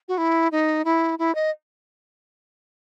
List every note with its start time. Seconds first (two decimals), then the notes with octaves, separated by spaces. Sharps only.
0.08 F#4
0.18 E4
0.52 D#4
0.85 E4
1.19 E4
1.35 D#5